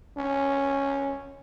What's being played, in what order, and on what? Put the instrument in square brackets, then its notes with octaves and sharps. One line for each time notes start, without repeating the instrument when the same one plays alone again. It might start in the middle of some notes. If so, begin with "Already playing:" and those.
[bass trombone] C#4